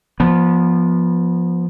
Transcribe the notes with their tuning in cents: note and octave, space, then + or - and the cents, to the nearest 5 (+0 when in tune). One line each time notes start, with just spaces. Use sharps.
F3 +0 B3 -30